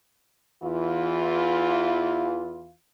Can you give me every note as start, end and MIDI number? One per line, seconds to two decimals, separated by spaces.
0.63 2.72 40
0.63 2.72 52
0.63 2.72 65